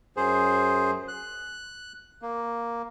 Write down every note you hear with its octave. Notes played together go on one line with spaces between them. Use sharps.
F#2 G#4 C5
F#6
A#3